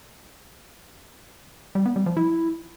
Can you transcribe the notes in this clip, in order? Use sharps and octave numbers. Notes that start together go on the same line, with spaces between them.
G3
B3
G3
F3
E4